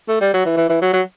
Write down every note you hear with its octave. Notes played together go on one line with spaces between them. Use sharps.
A3
G3
F#3
E3
E3
E3
F#3
F#3